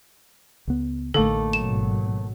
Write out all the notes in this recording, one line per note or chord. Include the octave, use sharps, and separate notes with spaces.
C#2 B3
A1 D3 A3 A#3 D#4 A4
G#1 B2 F#3 E7